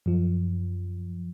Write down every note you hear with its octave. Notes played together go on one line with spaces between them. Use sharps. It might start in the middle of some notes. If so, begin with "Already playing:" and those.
F#2 F3